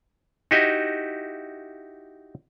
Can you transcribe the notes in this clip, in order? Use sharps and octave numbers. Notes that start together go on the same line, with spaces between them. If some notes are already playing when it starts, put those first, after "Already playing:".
D#4 E4 F#4 G4 D#5 E5